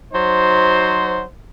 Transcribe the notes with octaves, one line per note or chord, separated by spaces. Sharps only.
F#3 D#4 C5